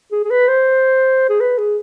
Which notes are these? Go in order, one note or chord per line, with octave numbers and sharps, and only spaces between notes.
G#4
G#4
B4
C5
G#4
B4
G#4